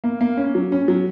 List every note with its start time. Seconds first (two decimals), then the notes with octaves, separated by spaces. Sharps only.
0.04 A#3
0.21 A#3
0.37 C#4
0.55 F#3
0.72 C#4
0.88 F#3